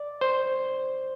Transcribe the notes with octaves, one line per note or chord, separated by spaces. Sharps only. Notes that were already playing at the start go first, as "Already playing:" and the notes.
Already playing: D5
C5